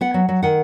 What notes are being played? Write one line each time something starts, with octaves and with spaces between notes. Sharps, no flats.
B3 F#5
F#3
F#3
D#3 F#5